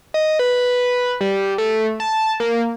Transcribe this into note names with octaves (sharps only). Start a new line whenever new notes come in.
D#5
B4
G3
A3
A5
A#3